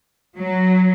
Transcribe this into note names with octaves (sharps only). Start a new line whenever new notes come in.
F#3